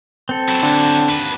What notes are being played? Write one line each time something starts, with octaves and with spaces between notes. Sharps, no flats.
C4 A4
F#3 E4
D3
D#2 B4